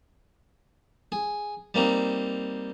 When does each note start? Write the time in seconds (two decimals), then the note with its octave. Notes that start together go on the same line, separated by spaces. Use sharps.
1.12 G#4
1.74 G3 A#3 C4 D#4